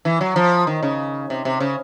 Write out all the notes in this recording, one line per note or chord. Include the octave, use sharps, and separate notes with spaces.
E3
F#3
F3
D#3
C#3
C3
C3
C#3